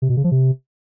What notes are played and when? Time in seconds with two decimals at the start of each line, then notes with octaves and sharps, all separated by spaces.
0.02 C3
0.09 B2
0.17 C#3
0.24 F3
0.31 C3